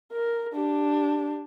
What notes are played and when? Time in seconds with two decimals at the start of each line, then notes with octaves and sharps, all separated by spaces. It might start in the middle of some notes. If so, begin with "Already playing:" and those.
0.12 A#4
0.53 D4 G4